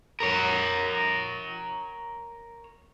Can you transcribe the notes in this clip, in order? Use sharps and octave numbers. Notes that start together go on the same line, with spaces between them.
A#4 C#5